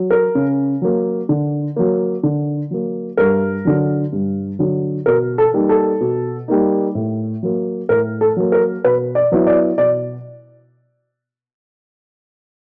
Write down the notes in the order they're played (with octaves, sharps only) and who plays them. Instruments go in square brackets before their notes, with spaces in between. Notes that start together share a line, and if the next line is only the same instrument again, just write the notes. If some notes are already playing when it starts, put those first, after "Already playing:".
Already playing: [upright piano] F#3
A#4
C#3
F#3 A#3
D3
F#3 A#3
D3
F#3 A#3
G2 A#4
D3 F#3
G2
D3 F#3
B2 A#4
A4
G3 A#3 D#4
A4
B2
G3 A#3 D#4
A2
F#3 A#3
A2 A#4
A4
F#3 A#3
A#4
B2 B4
D5
F#3 B3 E4
D5
B2 D5